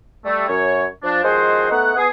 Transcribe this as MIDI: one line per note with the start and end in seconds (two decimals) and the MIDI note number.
0.25 0.46 55
0.25 0.46 57
0.48 0.84 42
0.48 0.84 73
1.03 1.22 53
1.03 1.22 62
1.23 1.70 51
1.23 1.70 53
1.23 1.70 56
1.23 1.70 66
1.23 1.70 68
1.23 1.70 72
1.70 1.95 57
1.70 1.95 59
1.70 1.95 63
1.70 1.95 78
1.96 2.08 59
1.96 2.08 68